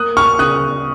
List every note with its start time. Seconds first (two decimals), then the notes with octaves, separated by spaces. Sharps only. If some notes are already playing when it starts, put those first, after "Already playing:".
Already playing: A#3 D#6 F#6
0.17 C#6 F6
0.39 C#3 D#6 F#6